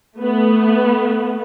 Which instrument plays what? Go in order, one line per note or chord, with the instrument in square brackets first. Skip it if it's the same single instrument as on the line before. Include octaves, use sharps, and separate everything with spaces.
[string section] A3 B3